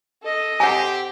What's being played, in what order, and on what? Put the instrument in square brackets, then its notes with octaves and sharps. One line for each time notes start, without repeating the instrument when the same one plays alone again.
[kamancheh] A4 D#5
[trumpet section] C4 G4 [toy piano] F#5 G#5